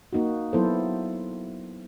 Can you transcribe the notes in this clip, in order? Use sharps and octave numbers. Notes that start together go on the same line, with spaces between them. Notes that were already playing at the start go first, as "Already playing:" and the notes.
A#3 D#4 F#4
F#3 B3 E4 A4 C5